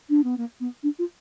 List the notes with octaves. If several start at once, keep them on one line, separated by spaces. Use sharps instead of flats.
D4
B3
A#3
B3
D4
F4